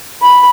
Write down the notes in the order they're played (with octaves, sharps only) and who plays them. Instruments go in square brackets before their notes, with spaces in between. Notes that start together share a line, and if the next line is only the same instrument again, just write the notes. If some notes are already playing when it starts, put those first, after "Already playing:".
[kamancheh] B5